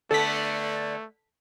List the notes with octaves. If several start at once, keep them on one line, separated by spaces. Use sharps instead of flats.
D3 A3 B3 A4 B6